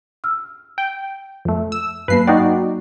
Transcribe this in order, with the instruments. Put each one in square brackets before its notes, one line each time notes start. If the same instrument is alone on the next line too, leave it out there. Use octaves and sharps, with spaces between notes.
[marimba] E6 F6
[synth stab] G5
F2 A3
E6
[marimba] G2 F#3 A#3 [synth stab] B4 C7
[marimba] G2 G5 [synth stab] D#4 F#4 D5